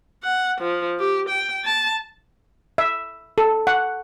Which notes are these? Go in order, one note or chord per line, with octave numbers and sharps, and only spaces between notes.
F#5
F3
G4
G5
A5
E5
A4
F#5